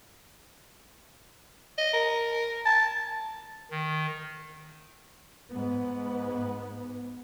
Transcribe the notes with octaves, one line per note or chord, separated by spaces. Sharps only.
D#5
A#4
A5
D#3
G#2 B3